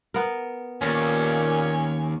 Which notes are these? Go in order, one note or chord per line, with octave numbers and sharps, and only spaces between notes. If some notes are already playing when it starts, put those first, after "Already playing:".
B3 A#4
D#2 A#2 C#4